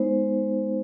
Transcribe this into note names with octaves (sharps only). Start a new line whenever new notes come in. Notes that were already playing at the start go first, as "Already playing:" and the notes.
Already playing: G#3 B3 D#4 C5